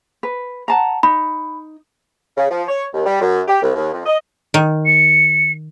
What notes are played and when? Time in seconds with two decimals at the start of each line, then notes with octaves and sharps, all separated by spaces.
0.23 B4
0.68 F#5 A5 A#5
1.03 D#4 B5
2.37 C#3
2.50 F3
2.69 C#5
2.93 D#2
3.06 G3
3.21 F#2
3.48 G4
3.62 C2
3.75 D#2
3.93 F2
4.06 D#5
4.54 D#3
4.86 C#7